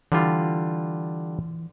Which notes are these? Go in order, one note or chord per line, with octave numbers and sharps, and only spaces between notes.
D3 E3 G3 F4